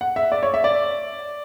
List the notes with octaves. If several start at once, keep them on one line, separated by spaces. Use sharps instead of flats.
F#5
E5
D5
C#5
E5
D5